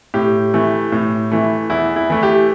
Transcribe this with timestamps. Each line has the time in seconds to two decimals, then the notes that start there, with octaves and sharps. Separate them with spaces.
0.14 A2 G4
0.54 E3 A3
0.92 A2
1.32 E3 A3
1.70 E2 E4
1.96 E4
2.10 E3 A3
2.23 G4